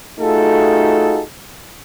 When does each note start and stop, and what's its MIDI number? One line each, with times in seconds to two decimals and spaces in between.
0.20 1.21 57
0.20 1.21 63
0.20 1.21 65
0.20 1.21 66
0.20 1.21 68
0.20 1.21 69